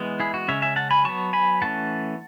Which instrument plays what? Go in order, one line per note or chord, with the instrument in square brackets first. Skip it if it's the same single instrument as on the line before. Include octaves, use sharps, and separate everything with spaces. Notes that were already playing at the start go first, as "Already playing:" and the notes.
Already playing: [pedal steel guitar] E3 G#3 B3
E4 G#4
F#4
C#3 G#3 C#4 C#5 E5
E5 G#5
F#5 A5
G#5 B5
F#3 B3 A5 C#6
G#5 B5
E3 A3 C#4 F#5 A5